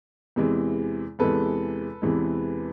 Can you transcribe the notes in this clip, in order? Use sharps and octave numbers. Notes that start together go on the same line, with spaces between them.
E2 C3 E3 G#3
E2 C3 E3 G#3 A4 B4
E2 C3 E3 G#3